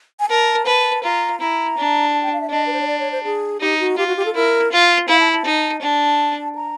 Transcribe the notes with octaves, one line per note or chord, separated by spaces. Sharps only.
G#5
A#4 A5
B4 A5
F4 A#5
E4 A#5
D4
A5
G5
F5
E5
D4 D#5
B4
C5
C#5
D5
C#5
C5
G#4
D#4 G4
F#4
F4 G4
F#4
G4
A4
E4 A#4
F4
E4 F5
A5
A5
D#4
D4 A5
A#5